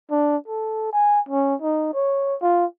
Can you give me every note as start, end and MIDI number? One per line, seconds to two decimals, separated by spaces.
0.11 0.36 62
0.48 0.91 69
0.93 1.20 80
1.29 1.55 61
1.62 1.89 63
1.94 2.35 73
2.42 2.65 65